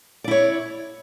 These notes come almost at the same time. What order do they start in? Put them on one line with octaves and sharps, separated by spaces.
D5 E4 C#5